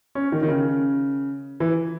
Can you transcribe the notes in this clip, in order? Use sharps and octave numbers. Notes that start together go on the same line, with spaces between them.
C#4
D#3
D#3
C#3
E3